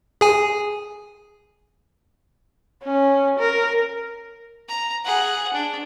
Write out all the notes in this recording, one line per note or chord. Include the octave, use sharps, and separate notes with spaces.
G#4 G#5
C#4
A#4
A#5
G#4 F#5
D4